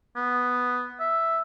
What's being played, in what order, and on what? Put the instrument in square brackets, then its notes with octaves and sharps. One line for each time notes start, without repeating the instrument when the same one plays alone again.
[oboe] B3
E5